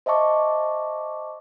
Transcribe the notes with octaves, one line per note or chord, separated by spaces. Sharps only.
C5 D#5 E5 A5 C#6 D6